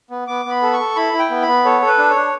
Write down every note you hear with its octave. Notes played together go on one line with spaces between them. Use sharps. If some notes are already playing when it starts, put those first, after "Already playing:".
B3
B3 D6
B3 B5
A4
C#6
A4
E4 B5
E4
G5
B3
B5
B3
A4 C#5
A4
B4
D4
C#5
D4